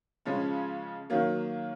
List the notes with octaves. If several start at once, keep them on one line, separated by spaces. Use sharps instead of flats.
C#3 F3 G#3 C#4
D#3 F#3 A#3